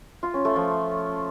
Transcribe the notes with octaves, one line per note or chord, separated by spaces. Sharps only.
F4
C#4
A3
F3